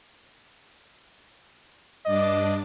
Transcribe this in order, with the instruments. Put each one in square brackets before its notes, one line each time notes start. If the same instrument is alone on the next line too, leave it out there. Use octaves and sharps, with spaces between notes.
[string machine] G2 D4 D6 [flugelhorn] D#5